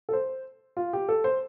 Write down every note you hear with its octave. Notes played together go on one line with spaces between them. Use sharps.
A4
C5
F4
G4
A4
C5